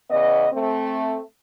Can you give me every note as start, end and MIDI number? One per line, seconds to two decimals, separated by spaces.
0.10 0.46 40
0.10 0.46 49
0.10 0.46 59
0.10 0.46 75
0.52 1.21 57
0.52 1.21 60